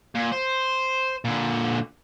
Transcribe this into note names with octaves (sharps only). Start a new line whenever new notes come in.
A#2
C5
A#2 D3